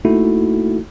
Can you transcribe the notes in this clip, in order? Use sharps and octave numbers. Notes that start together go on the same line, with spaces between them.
A3 A#3 D#4 E4 F#4 A4